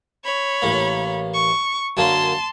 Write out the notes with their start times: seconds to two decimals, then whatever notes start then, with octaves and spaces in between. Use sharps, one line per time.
0.24 C#5 B5
0.62 A1 A#3
1.34 C#6
1.97 F#2 D3 A#3 A5 C6